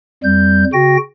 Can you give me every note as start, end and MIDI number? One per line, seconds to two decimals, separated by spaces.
0.24 0.64 41
0.24 0.64 55
0.24 0.64 91
0.73 0.97 49
0.73 0.97 66
0.73 0.97 79
0.73 0.97 94